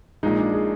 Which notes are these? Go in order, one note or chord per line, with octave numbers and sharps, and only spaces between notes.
A#1 A#2 G#3 D#4
D4
G#4